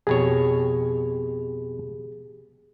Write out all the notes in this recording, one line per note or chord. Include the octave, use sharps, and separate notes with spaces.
F2 B2 G4 G#4 C#5